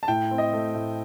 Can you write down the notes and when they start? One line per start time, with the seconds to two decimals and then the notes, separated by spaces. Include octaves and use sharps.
0.03 A5
0.08 A2 G5
0.31 C4
0.38 D#5
0.53 A3
0.75 A2